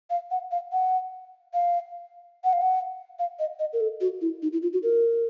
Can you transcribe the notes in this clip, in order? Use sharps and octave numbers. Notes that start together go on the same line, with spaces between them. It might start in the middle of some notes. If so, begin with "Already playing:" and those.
F5
F#5
F5
F#5
F5
F#5
F5
F#5
F5
D#5
D#5
A#4
A4
F#4
E4
D#4
E4
F4
F#4
A#4